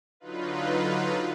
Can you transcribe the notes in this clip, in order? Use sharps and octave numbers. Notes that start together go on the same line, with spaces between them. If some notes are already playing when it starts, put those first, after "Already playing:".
D3 F#3 D#4 F4 B4